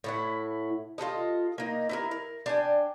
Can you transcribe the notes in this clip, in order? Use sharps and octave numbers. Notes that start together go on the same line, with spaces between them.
A2 E4 F#5
F4 G#4 A4 D#5
A#3 D#4
E4 F4 A#4
A#4
D4 G5 G#5